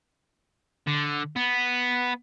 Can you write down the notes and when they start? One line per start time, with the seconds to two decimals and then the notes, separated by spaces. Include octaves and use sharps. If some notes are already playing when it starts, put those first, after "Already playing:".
0.87 D3
1.36 B3